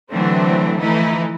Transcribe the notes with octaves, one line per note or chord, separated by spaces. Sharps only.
D3 E3 F#3 A3 C4 D4
E3 F3 A3 D#4 E4